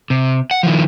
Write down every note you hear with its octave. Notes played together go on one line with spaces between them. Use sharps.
C3
F#5
D#3 F3